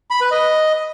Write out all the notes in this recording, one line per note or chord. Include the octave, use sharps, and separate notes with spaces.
B5
B4
D#5